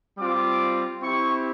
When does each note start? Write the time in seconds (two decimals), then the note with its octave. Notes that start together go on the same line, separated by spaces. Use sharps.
0.17 G3 C4 F4 D6
1.00 C4 E4 G4 C#6